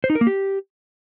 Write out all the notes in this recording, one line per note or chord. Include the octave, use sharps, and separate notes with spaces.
C5
D#4
A#4
A#3
G4